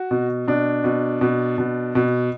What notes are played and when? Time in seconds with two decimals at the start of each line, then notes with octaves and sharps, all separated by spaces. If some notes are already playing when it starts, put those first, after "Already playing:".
Already playing: F#4
0.11 B2
0.47 B2 D4
0.84 B2
1.21 B2
1.58 B2
1.95 B2